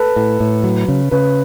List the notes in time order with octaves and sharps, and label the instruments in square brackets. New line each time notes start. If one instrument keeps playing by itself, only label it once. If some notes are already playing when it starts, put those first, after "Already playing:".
Already playing: [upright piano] A4 B4
[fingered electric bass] A2
A2
F#3
C#3
[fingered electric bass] C#3 [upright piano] B4